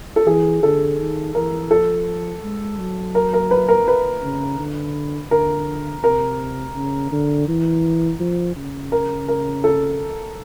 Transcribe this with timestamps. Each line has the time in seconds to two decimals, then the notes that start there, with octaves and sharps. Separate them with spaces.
0.16 A4
0.26 E3 G#4
0.63 D3 A4
0.99 D#3
1.35 E3 A#4
1.71 F3 A4
2.43 G#3
2.79 F#3
3.15 A#4
3.33 A#4
3.51 B4
3.68 A#4
3.88 B4
4.23 C#3
4.59 D3
5.31 D3 A#4
6.04 C3 A#4
6.75 C#3
7.12 D3
7.48 E3
8.20 F3
8.56 C#3
8.92 A#4
9.28 A#4
9.64 A4